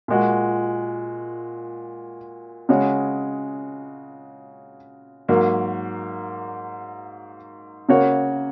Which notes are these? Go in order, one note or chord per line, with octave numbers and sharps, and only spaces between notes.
A#2 G#3 F#4
C#3 G#3 F#4 C#5
G#2 F#3 A#3
C#3 A#3 F#4 C#5